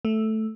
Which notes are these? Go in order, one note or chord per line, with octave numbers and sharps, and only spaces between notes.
A3